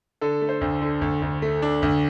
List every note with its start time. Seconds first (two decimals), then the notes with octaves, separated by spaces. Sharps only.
0.21 D3 A4
0.42 A3
0.49 C5
0.61 D2
0.82 D3
1.01 D2 A4
1.22 D2
1.42 A3
1.62 D4
1.82 D2